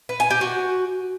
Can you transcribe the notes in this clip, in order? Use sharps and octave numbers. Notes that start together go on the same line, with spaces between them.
B4
G#5
G4
F#4